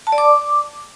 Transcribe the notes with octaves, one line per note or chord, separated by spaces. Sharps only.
A5
D5
D6